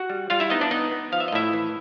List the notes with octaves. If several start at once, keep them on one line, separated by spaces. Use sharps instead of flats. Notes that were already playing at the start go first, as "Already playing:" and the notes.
Already playing: F#4 F#5
G3
G3 F4 F5
E4 E5
B3 D#4 D#5
D4 D5
B3 D#4 D#5
B3
F3 F5
E5
D#5
A2 E4 E5
E3